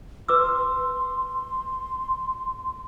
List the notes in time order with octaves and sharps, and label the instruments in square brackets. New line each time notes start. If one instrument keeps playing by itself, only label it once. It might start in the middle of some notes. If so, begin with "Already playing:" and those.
[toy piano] B4 D6 E6 [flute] C6